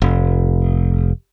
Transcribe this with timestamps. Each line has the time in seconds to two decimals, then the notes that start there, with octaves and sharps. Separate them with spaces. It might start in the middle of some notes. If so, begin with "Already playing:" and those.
0.02 F1